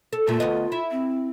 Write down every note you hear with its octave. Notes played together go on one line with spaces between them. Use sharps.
A4
A#2 A3 F4
D2 B3 D#5
E4
C4